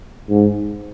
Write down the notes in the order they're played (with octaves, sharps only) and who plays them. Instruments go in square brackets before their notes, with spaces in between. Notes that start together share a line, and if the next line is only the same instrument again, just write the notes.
[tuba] G#2